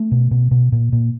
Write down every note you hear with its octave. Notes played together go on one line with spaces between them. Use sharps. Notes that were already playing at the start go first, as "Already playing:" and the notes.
Already playing: A3
B2
B2
B2
A#2
A#2